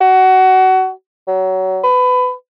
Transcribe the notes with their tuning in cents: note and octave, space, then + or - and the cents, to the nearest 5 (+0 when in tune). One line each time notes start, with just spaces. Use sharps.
F#4 +20
F#3 +25
B4 +25